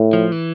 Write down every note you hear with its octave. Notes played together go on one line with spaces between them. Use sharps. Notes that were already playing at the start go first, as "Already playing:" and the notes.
Already playing: A2
F3
E3